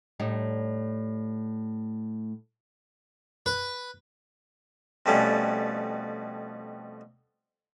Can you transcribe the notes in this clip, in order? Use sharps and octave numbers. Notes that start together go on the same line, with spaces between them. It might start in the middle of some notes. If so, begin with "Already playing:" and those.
A2 G3 D#4
B4
F2 B2 G3 A3 C#4